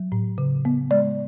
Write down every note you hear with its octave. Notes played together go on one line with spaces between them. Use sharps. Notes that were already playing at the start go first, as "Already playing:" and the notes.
Already playing: F#3
A2
C#3
B3
G#3 D5